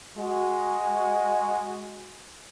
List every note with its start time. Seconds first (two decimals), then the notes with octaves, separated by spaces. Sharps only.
0.18 G#3 F#4